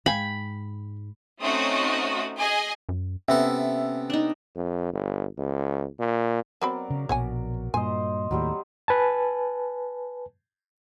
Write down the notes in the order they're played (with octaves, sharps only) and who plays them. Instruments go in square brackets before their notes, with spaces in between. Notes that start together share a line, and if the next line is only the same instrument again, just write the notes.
[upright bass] G#2 [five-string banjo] F5 G5 G#5 [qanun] B5
[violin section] A3 C4 C#4 D#4 F#4 D#6
G#4 D#5 G#5
[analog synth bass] F#2
[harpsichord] C3 B3 A4 [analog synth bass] C#4 [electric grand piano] E5
[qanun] D4 D#4
[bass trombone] F2
G1
C#2
A#2
[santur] F#3 A#4 D5 [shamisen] B3 C4 B5
[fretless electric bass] C#3
[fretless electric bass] A#1 B2 [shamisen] C#5 F#5 G#5
[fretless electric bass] G2 A#2 [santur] C5 D#5 [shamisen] G#5
[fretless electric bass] D#2 A2 [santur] F#3 G3 C4
[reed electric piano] B4 G#5 A5